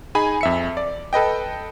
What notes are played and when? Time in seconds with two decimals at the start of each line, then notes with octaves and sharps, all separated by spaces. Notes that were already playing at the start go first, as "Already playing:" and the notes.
0.15 D#4 G#4 G#5 B5
0.41 F2 E5 C#7
0.77 D5
1.13 A4 B4 D#5 G5